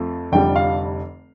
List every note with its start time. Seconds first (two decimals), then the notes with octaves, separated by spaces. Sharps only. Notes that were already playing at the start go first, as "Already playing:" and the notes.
Already playing: F2 F3 A3
0.32 F1 F2 D3 G3 G5
0.56 F5